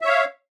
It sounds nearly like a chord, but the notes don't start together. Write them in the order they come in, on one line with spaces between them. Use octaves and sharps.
E5 C#5 F5